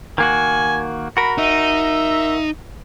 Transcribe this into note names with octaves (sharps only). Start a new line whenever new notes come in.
D#3 A#3 F#4 G#5
F#4 A#4 B5
D#4 E5